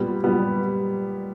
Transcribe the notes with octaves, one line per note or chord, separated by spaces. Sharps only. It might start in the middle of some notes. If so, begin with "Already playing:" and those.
Already playing: A#2 G3 B3
A#2 G3 B3